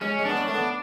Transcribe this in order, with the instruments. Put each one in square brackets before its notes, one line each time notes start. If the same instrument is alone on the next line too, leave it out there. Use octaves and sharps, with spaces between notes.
[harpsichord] G#3 [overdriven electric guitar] C#4
[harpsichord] G#3
[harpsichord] B3 [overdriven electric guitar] D4
[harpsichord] C#4
[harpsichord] A3 [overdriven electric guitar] D4
[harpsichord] B3